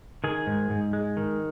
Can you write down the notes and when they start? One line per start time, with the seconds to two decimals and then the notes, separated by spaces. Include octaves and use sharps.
0.24 D#3 G#4
0.47 G#2
0.70 G#2
0.93 G#3
1.17 D#3